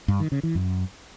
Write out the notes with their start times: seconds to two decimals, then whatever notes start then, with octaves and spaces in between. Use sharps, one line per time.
0.08 G2
0.20 D#3
0.32 C#3
0.43 E3
0.55 F#2